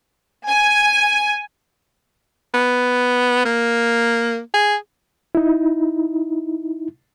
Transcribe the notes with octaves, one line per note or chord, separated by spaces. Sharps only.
G#5
B3
A#3
G#4
D#4 E4